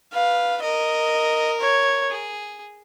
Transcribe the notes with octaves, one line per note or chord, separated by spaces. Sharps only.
B4 F5
A#4 D#5
C#5
G#4